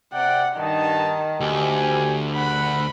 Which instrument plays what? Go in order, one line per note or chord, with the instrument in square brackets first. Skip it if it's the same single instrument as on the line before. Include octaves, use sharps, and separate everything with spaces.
[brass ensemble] C3 D5 G5 [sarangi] F#5
[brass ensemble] G2 D#4 A5 [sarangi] D#3
[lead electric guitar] D2 [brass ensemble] G4 G#5
[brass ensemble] A#1 F#5 [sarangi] B5